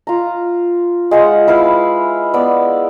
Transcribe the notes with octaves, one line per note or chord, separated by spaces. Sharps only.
F4 A#5
G#3 F4 F#5 G5
E4 B4 F5
B3 D5 E6